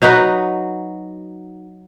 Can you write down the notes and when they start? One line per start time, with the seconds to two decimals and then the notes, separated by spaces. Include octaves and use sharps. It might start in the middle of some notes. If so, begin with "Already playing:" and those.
0.02 F#3 D#4 F#4 B4